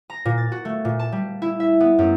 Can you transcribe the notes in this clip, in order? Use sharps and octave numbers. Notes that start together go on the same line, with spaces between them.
A#5
A#2
A6
F#4
A3
A#2
A5
G3
E4
E5
B3
F#2